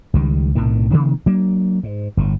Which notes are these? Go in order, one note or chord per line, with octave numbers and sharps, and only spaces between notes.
C#2 D#3 G3
B1 A2 C3 D#3
C3 D#3 F3 A#3
F#3 A#3 D4
G#2
G1 A2